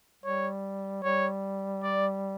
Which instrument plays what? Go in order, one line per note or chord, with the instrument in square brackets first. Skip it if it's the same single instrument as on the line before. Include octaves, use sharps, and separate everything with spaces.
[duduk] G3 [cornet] C#5
[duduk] G3 [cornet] C#5
[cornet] D5